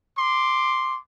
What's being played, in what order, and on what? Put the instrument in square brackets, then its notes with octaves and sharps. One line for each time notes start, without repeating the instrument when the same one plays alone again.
[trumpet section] C6 D6